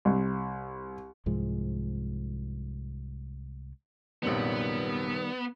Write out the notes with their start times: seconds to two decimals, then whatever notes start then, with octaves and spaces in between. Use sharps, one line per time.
0.05 C2
1.26 C2 G#2 F3 G#3
4.23 A#1 F#2 C3 D#3 G3 B3